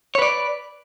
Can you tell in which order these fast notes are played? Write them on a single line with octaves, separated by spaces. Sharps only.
C#5 B4 D5